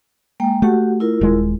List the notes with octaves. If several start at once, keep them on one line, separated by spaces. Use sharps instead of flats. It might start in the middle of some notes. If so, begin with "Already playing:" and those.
G#3 A#3 G5
A3 F#4 G4 F#5
E4 F4 A#4
D#1 G#3